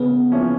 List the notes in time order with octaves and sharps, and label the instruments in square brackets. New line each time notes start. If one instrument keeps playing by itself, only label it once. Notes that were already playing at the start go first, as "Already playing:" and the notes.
Already playing: [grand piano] C#3 [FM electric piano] B3
[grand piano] F3 A#3 C#4 E4